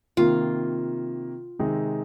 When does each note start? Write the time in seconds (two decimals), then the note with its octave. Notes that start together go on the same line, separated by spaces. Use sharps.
0.17 C3 D#3 A#3 F4
1.59 C3 D#3 G#3 C4 D#4